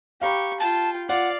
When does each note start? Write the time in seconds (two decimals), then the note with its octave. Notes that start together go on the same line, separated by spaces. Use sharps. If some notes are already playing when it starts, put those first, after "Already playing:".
0.21 G4 F5 A#5 B5 C#6
0.60 F4 G5 A5
1.09 F4 D5 F5 F#5